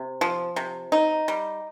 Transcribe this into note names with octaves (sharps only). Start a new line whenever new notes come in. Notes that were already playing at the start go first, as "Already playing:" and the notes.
Already playing: C3
F3
C3
D#4
G3